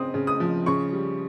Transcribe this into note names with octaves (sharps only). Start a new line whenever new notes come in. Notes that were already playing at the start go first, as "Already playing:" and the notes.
Already playing: C#3 C4 D#6
C#3
D#6
F3
C#3 C#6
G3